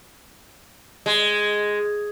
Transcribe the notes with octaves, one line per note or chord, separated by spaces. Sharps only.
G#3